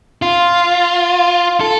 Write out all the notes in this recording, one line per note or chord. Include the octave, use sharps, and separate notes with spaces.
F4
A4